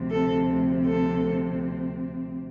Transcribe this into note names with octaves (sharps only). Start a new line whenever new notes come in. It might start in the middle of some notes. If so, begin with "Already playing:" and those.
Already playing: D2 C3 F3 C4
A4
A4